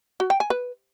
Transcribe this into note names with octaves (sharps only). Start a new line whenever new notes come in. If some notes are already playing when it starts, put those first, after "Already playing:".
F#4
G5
G#5
B4